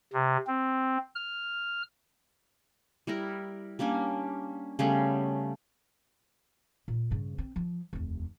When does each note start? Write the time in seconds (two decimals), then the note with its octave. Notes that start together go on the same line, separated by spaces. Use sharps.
0.13 C3
0.47 C4
1.15 F6
3.07 G3 E4 A#4
3.79 G3 A#3 C#4 D4
4.79 C#3 G3 A3 B3
6.88 A#2
7.11 G2 C#3
7.38 C4
7.56 F3
7.93 F1 D#2